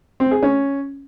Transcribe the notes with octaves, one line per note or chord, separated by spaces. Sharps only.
C4
G#4
C#4